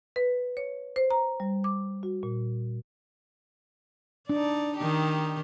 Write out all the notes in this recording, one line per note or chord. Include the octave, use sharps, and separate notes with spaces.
B4
C#5
C5
A#5
G3
D6
F#4
A#2
D4 D#4 D5
D#3 D#4 G4